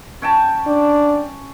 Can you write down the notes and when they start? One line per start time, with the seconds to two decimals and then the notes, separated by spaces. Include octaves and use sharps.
0.22 C#4 G5 A5
0.67 D4